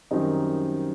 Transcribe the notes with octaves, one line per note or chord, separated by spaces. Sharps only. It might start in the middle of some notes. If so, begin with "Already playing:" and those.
F#2 D#3 G3 C4 D#4